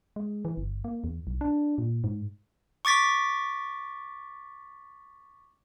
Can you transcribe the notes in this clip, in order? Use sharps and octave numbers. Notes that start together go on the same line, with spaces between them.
G#3
E3
G1
A#3
E2
B1
D4
A#2
G#2
C#6 D6 A6 B6